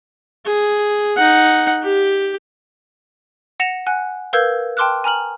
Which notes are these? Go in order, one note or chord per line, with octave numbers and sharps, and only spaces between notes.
G#4
D#4 F#5
G4
F#5 A#6 C#7 E7 F7
F#5 G#5 F#6
A#4 B4 F5 E6 G6 G#6
G5 A5 C6 D6 F6 F#6
G#5 A#5 F6 F#7